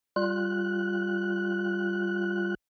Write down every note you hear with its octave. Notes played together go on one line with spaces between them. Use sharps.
G3 F4 F#6